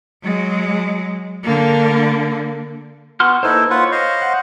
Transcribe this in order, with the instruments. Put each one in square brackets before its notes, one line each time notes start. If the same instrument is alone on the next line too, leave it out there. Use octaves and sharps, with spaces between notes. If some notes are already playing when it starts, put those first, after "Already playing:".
[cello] F#3 G#3
D3 A#3
[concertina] B3 [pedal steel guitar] F#4 C6 F6
[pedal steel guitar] A#3 B4 C5 [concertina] D#4 E4 A4
[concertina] F4 B4 F#5 [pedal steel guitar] C#5
[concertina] C5 D#5 F5
[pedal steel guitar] F#5